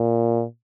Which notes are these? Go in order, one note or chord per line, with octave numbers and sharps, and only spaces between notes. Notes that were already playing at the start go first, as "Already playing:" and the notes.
Already playing: A#2